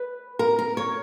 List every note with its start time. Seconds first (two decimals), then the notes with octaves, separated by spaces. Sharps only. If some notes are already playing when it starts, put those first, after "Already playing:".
Already playing: B4
0.39 A#4
0.59 A#4
0.77 C#5